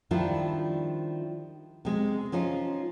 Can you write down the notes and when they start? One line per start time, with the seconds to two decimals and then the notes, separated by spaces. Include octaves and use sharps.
0.11 D#3 F3 G3 D4 E4 F4
1.85 C3 G#3
2.32 F3 C#4 D#4 F4